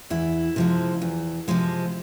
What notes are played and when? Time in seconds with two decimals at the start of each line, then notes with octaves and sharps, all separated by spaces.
0.10 E2 E4
0.56 C3 F3 G#3
1.01 E2
1.48 C3 F3 G#3